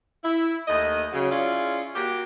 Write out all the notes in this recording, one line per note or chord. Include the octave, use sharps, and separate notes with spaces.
E4
D#2 A3 D#5
C#3 F#3
C#4 E4 F4 G#4 D5
A#3 F#4 G4